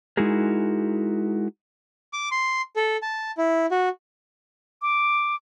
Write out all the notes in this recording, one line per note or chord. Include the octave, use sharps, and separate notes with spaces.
G#3 D#4 E4 F#4 G#4 A#4
D6
C6
A4
A5
E4
F#4
D6